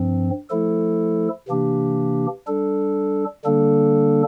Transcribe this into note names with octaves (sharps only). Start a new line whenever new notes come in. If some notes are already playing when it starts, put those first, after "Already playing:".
Already playing: G2 F3 C4
F3 A3 E4 A4
C3 E3 A#3 D4 G4
G3 D4 A4
D3 G3 A#3 D4 A4